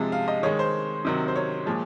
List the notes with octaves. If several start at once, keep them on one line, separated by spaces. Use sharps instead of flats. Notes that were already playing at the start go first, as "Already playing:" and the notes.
Already playing: C3 F3 G#3
F5
D#5
D#3 G#3 C#5
C5
C3 D#3 F#3
C5
C#5
A#2 F3 G#3